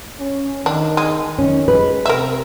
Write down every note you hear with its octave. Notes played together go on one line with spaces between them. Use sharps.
C#4
D#3 D4
G#3
D#3 C#4
G#3 B4
C3 A#4 E5